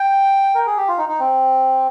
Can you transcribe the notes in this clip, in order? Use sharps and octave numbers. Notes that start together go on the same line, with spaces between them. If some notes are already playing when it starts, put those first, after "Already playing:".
Already playing: G5
A#4
G#4
G4
F4
D#4
D#4
C4